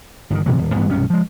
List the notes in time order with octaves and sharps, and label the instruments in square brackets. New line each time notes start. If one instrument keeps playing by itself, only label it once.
[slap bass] G1 B2 D#3
A2 C3 E3 F#3
D#1
A1 G2 E3 B3
B1 G2 C3 C#4
F3 G#3